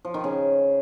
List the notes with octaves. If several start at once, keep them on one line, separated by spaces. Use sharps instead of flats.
F3
D#3
C#3